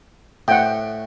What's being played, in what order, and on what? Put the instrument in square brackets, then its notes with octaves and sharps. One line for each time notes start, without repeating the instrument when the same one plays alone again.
[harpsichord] A2 [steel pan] F#5 G5